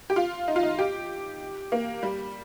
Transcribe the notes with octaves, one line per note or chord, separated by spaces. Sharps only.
G4
F4
D#4
F4
D#4
G4
A#3
G3